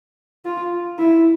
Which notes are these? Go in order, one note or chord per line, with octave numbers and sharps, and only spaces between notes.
F4
E4